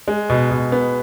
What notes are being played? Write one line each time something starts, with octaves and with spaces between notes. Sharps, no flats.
G#3
B2
B2
B3